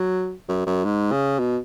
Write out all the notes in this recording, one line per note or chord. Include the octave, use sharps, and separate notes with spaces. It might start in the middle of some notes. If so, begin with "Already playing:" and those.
Already playing: F#3
F#2
F#2
G#2
C#3
B2